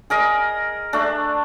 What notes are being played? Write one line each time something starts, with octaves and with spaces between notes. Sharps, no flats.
G#4 A#4 D#5
A3 D4